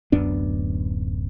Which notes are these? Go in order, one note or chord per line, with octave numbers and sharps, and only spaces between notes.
D1 F#2 B3 D4